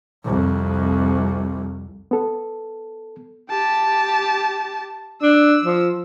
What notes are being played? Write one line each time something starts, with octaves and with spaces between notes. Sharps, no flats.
C2 F2
B3 A4
G4 A5
D4 E6
F3